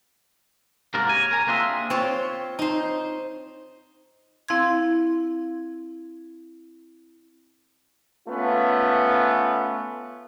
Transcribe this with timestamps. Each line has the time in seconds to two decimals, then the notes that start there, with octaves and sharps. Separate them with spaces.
0.94 G#2 C3 A#3 F#4 A#4 D5
1.09 C#5 G#5
1.31 A#4 G#5 A#5
1.47 A#3 C4 D4 F4 G#4 E5
1.90 C4 F4 C#5
2.59 D#4 C5
4.48 C4 E4 F5 C6 G#6
8.28 A3 B3 C#4 F4